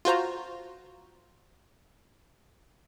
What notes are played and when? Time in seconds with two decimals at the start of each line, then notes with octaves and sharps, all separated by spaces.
0.05 F4 F#4 C5 A#5